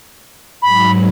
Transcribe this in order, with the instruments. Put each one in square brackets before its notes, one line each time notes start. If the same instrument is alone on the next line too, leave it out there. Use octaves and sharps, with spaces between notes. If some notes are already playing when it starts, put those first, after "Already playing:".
[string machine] G#2 F#3 [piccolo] B5